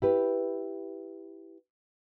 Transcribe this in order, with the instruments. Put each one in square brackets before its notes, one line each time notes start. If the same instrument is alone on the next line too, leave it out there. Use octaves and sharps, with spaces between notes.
[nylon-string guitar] E4 G4 B4